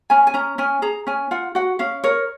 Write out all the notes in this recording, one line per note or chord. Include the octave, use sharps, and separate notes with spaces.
C#4 G#5
G#5
C#4 A#5
C#4 G#5
G#4 A#5
C#4 G#5
F4 F#5
F#4 F#5
C#4 F5
A#4 C#5